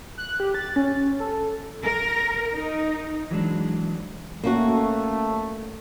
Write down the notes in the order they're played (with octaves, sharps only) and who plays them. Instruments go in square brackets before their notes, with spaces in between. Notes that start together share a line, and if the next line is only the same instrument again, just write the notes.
[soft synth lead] F#6
G4
A6
C#4
A4
[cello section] A#4
D#4
[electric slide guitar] E3 F#3 G#3 D4
[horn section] A3 [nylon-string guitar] A#3 C#4 F#4